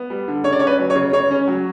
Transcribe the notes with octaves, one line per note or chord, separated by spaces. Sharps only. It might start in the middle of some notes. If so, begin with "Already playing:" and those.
Already playing: B3
G3
D3
C#3 C#5
D5
C#4 C#5
B4
F#3
C#5
C#3
C#3 C#5
C#4
F#3